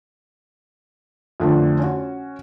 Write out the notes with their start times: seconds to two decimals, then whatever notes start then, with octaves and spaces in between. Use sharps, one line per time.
1.40 F2 D3 A3 D4
1.79 C#4 F#4